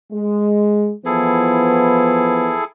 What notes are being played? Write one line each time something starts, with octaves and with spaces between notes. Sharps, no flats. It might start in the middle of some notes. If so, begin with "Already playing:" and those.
G#3
E3 F3 B3 E4 G#4 A4